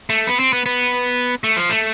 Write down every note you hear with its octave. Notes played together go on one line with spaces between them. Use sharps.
A3
B3
C4
B3
B3
A3
F3
A3